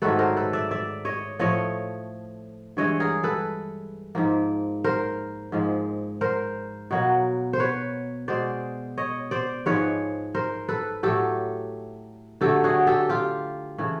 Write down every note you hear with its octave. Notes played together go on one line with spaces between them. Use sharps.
G#2 D#3 F#3 A3 A4 B4
A#4 C5
A4 B4
D5 E5
D5 E5
C#5 D#5
A2 F3 A3 C#5 D#5
G2 E3 G#3 C#5 D#5
G#4 A#4
A4 B4
G#2 F3 A#3
A#4 C5
G#2 F3 G#3
A#4 C5
B2 F#3 A#3
C5
B4 C#5
B2 G#3 C5 D5
C#5 D#5
C5 D5
G#2 F3 G#3 B4 C#5
A#4 C5
A4 B4
A2 F#3 A3 G4 A4
D3 F#3 A3 G4 A4
F#4 G#4
G4 A4
F4 G4
C#3 E3 A3